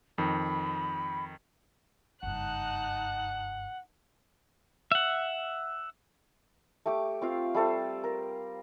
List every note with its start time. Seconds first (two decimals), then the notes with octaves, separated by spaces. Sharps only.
0.18 F2 D#3 B5
2.23 F#1 G2 D#4 F#5 A5 F#6
4.92 E5 F#5
6.86 A3 G4 D6
7.21 C4 F4 F5
7.54 G3 A3 A4 C5
8.04 A#4